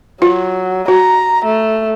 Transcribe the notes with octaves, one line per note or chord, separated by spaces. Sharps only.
F#3 F4
F#4 A#5
A3